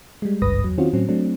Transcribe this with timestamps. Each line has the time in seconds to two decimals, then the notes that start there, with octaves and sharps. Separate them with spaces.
0.22 G3 G#3
0.42 G#1 C#2 G2 B4 D#6 A#6
0.64 E2 F#3
0.78 D#3 C4 C#4 F4 F#4
0.93 A2 F#3 C4 C#4
1.08 F#3 A3 C4 D4